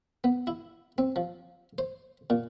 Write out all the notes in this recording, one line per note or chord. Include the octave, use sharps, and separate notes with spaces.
B3
E4
C4
F3
C5
A#2